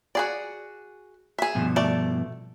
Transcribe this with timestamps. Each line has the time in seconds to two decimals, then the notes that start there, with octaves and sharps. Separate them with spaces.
0.15 F#4 G#4 D5
1.38 G#4 E5
1.55 G2 B2 F3
1.76 A3 D5